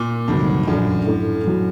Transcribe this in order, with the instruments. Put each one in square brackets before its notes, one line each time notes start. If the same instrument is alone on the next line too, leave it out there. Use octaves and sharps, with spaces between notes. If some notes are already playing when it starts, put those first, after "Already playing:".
Already playing: [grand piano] A#2
[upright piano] D2 C3 D#3 F#3 C4 [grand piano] G2
[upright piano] A#1 A#2 F#3 A3 D4 [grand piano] F#2
[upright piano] A2 A3 D4 A4
A1 A2 F#3